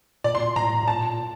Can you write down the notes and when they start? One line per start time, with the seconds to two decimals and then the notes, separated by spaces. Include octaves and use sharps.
0.24 A#2 D5
0.35 C6
0.56 A2 A#5
0.83 A2
0.88 A#2 A5